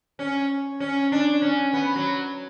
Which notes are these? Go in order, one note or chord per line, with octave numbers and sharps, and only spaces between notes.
C#4
C#4
D4
C#4
B3
F#3